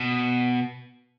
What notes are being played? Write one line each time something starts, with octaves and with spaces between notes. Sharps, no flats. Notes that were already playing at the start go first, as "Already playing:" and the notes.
Already playing: B2